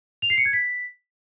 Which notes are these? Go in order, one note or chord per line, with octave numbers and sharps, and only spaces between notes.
F7
C7
C#7
G#6
B6